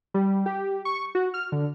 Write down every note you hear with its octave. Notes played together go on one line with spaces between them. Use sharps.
G3
G4
C#6
F#4
F6
D3